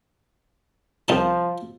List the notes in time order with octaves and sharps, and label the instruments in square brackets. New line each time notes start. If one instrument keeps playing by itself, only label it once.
[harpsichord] C2 D#4 A5 [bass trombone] F3